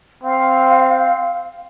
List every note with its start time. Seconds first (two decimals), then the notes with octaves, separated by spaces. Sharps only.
0.23 C4 F5